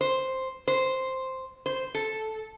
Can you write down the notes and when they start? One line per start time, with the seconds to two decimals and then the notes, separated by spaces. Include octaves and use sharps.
0.01 C5
0.68 C5
1.66 C5
1.95 A4